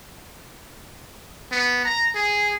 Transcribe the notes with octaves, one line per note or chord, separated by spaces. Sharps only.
B3
A#5
G#4